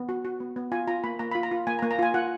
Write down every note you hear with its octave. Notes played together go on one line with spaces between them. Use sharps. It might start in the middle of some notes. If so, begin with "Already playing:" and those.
Already playing: B3
F#4
F#4
B3
B3
F4 G#5
F4 A#5
A#3 B5
A#3 A#5
B5
F4
A#5
F4
A#3 G#5
A#5
A#3
A#5
F4 G#5
F4 F#5